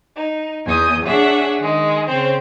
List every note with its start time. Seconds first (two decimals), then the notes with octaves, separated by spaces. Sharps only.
0.16 D#4
0.66 E2 G#5 D#6 G6
1.05 D4 G#4 C#5 E5 F#5
1.59 D#3 G#3
2.07 C#3 C4 C5